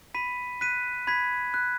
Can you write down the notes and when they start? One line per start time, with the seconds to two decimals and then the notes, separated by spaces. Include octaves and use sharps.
0.15 B5 B6 D#7
0.61 F#6 B6 D#7
1.07 B5 G#6 B6
1.54 F#6